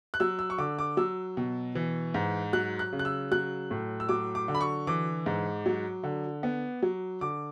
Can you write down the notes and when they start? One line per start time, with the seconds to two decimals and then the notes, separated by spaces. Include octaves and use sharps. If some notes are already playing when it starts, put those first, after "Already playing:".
0.14 F#6
0.20 F#3 E6
0.39 E6
0.50 C#6
0.58 D3 D6
0.79 D6
0.97 F#3 E6
1.37 B2
1.75 E3
2.14 G#2
2.53 F#3 F#6
2.79 F#6
2.93 C#3
2.99 F#6
3.05 E6
3.31 F#3 F#6
3.71 A2
4.00 E6
4.09 F#3 D6
4.35 D6
4.48 D3
4.55 B5
4.61 C#6
4.87 E3 D6
5.26 G#2
5.66 F#3
6.03 D3
6.43 B3
6.82 F#3
7.21 D3 D6